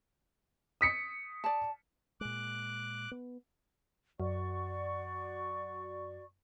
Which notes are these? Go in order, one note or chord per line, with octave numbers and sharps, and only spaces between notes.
D#6 B6 C#7
D5 A5
A#2 G#3 D6 F#6
B3
F#2 F#4 D5 C#6